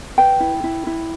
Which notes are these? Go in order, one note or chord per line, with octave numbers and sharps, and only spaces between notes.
B4 G5
E4
E4
E4